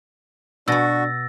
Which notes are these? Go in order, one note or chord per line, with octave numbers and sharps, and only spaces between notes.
B2 B3 D4 F#4 E6 A6 A#6